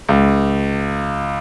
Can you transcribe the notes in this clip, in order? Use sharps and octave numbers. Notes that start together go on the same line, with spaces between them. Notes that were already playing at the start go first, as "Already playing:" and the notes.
C#2